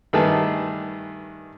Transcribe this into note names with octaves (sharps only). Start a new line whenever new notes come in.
G2 D#3 A3 G#4 B4 A5